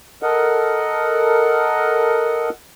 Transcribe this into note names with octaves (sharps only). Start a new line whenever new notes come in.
A4 A#4 D#5 F#5